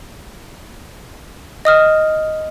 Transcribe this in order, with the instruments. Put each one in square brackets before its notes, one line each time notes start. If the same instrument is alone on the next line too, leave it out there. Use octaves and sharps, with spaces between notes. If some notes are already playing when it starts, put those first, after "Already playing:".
[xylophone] D#5 D#6 F6